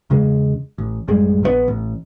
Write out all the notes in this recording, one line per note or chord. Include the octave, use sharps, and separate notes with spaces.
E2 C#3 G#3
A1
A1 F#2 G3 G#3
A#1 D3 B3
A1